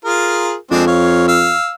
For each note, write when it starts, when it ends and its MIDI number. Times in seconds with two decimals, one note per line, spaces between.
0.05 0.54 65
0.05 0.54 68
0.05 0.54 70
0.71 1.54 41
0.71 0.84 56
0.71 0.84 60
0.71 0.84 62
0.87 1.26 73
0.87 1.26 77
1.28 1.73 77
1.28 1.73 88